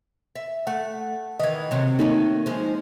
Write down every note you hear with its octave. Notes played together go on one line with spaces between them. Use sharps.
E5
A3 F#5
D#3 E3 D#5 G#6
C3 F#3
D#3 F#3 A3 A#3 D#4
F3 G#3